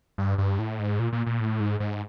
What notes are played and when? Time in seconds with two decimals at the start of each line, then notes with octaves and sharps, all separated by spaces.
0.18 G2
0.38 G2
0.59 A2
0.79 G#2
0.99 A#2
1.13 A#2
1.27 A#2
1.40 A2
1.60 G#2
1.80 G#2